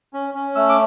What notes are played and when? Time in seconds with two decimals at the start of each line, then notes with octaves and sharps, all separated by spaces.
0.14 C#4
0.34 C#4
0.55 A3 E6
0.69 D6